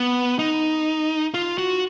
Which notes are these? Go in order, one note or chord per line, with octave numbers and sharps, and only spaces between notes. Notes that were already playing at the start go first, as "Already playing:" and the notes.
Already playing: B3
D#4
F4
F#4